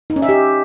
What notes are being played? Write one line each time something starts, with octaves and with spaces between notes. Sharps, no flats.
D#4
C#4
E5
G4